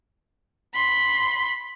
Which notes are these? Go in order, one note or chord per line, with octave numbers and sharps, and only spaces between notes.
B5 C6